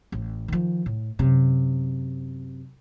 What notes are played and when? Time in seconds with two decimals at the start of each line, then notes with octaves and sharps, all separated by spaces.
0.12 A1
0.48 D#3 F3
0.86 A2
1.19 F#2 C3